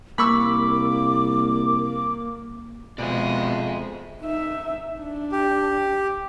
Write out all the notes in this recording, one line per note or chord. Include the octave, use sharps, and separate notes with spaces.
C2 A#3 B5 C#6 D6 E6
F2 B2 G#3 D5 E5
D#4 E5
D4
G4